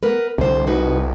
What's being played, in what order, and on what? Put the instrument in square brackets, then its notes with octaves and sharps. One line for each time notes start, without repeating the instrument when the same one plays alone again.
[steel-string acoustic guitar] B3 A#4 B4
[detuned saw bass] C2 [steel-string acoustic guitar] D3 C5
[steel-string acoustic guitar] D#4 F#4 B4